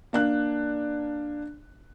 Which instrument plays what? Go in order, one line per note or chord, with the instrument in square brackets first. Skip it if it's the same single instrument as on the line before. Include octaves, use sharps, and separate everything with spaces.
[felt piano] A#3 D4 F#6